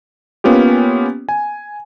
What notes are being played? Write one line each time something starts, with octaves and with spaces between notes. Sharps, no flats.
A#3 B3 C#4 F4 G4
G#5